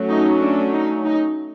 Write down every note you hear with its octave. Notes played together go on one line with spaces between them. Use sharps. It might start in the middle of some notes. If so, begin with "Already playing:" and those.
Already playing: F#3 A3 C#4
D#4
D4
D#4
D#4